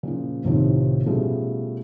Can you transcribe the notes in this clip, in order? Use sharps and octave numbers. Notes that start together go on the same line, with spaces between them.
A#2 C#3 F3
C2 A2 C3 D#3 F3 C4
B2 F3 G3 A3 C#4 G#4